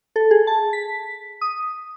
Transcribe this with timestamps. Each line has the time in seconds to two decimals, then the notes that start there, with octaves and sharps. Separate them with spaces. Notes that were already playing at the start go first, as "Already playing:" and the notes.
0.16 A4
0.31 G#4
0.47 A5
0.73 B6
1.41 D#6